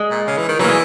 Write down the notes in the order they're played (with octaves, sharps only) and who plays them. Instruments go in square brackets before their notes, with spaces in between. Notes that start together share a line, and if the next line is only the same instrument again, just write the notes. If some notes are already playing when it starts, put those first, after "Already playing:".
Already playing: [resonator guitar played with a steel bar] G#3
[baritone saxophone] A#2
C#3
E3
D#3
[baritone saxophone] E3 [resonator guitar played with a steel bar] F#3 A#3
[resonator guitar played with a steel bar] G#3